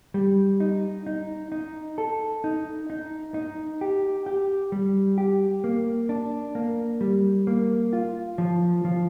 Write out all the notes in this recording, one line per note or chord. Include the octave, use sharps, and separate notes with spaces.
G3
D#4
D#4
D#4
A4
D#4
D#4
D#4
G4
G4
G3
G4
A#3
D4
A#3
G3
A#3
F4
F3
F3